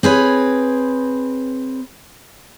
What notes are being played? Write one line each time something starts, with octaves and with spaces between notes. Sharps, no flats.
C4 G#4 B4 C#5